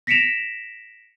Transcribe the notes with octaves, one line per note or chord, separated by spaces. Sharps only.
A#6 B6 C#7 D7 E7 F7